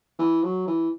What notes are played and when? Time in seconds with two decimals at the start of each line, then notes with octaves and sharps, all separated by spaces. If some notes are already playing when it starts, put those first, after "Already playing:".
0.19 E3
0.44 F#3
0.68 E3